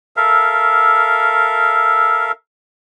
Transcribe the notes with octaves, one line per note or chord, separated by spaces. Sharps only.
A4 A#4 E5 F5